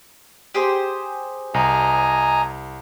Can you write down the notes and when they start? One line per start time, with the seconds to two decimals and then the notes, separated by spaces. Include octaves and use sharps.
0.55 G4 G#4 C5
1.54 C2 D#5 G#5 A#5